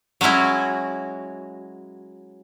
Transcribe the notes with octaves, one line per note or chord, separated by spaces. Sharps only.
F#3 G#3 C#4 E4 F#4